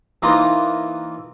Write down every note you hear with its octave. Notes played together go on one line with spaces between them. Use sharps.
E3 A#3 D#4 F4 C5 A#5